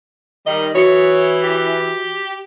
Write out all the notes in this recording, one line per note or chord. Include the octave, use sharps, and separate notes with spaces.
D#3 G3 D#5
E3 F#4 C#5 D#6 C#7
G4